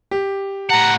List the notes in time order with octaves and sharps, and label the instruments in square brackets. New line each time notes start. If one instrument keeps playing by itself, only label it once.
[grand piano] G4
[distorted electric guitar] A2 F#5 [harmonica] A#5